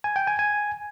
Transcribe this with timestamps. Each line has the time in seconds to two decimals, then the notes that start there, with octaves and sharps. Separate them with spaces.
0.04 G#5
0.16 G5
0.27 G#5
0.39 G#5